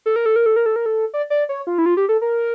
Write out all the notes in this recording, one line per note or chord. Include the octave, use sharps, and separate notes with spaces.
A4
A#4
A4
A#4
A4
A#4
A4
A#4
A4
D5
D5
C#5
F4
E4
F4
G4
A4
A#4